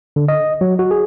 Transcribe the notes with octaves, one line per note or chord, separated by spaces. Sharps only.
D3
D#5
F#3
F#4
G#4